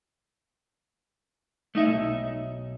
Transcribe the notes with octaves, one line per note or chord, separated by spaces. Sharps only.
A3 D#4 E5
B1